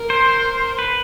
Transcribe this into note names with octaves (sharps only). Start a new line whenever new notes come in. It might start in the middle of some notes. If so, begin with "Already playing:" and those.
Already playing: A#4
C5
B4